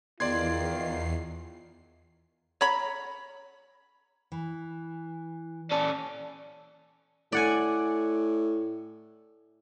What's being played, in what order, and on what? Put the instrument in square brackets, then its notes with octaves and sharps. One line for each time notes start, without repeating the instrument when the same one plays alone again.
[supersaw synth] E2 C7 [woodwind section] D#3 [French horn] F4 [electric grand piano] D5 C6 G#6
[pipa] C#5 A#5 B5
[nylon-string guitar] E3
[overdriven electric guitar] C#4 A4 [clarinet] D5
[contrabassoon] A2 [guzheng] D5 F#5 G#5